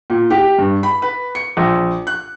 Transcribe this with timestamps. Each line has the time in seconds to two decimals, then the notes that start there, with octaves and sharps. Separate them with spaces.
0.10 A#2
0.30 G4
0.58 G2
0.83 B5
1.02 B4
1.35 C#7
1.57 A#1
2.07 F#6